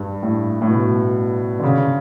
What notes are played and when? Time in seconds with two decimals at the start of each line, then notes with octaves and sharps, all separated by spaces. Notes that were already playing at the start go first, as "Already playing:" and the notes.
Already playing: G2
0.23 A2
0.62 A2
0.69 B2
1.60 D3
1.64 C#3